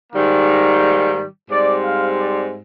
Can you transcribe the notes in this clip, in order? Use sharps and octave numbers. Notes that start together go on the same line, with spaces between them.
G#2 D#3 G3 A#3
G#2 G3 C4 D5
F5
D5